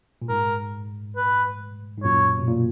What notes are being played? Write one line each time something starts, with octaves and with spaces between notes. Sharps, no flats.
A#2
G#2 A#4
B4
G#2
F#2 A#2 C#5
B2
A#2